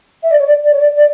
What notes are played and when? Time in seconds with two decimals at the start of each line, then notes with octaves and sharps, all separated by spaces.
0.23 E5
0.31 D5
0.39 C#5
0.46 D5
0.63 D5
0.72 C#5
0.80 D5
0.96 D5